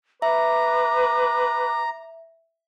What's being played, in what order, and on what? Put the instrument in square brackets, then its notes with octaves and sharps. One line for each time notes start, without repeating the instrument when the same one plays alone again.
[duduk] B4 [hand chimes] E5 [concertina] A#5 [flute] D6